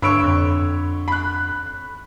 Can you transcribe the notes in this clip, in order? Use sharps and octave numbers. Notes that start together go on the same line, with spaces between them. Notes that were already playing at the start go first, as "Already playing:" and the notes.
G2 D3 C#5 B5 C#6 E6 D7
F2
B5 F#6